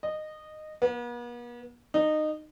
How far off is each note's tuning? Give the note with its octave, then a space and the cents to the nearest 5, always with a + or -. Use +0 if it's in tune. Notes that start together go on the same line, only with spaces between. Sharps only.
D#5 -15
B3 -45
D#4 -20